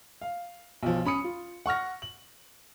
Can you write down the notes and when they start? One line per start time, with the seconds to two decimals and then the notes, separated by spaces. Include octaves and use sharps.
0.22 F5
0.83 B1 F3
1.05 C#4 B5 D#6 C#7
1.24 F4
1.66 F#5 C#6 F6 A#6
2.02 F#7